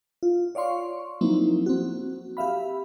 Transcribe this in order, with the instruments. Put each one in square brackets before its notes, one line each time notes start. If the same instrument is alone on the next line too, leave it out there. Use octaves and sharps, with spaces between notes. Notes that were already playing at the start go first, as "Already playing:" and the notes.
[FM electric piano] F4
C#5 D5 F5 C6 C#6
F3 F#3 A#3 C4 D#4 E4
C4 F#4
G4 E5 F5 B5